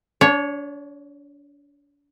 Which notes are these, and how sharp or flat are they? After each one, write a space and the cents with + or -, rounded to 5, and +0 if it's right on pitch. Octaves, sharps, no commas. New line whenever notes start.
D4 -35 C#5 +0